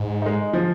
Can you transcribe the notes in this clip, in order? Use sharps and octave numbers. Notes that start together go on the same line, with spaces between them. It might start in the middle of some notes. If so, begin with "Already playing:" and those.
Already playing: G#2
G#3 D#4
F3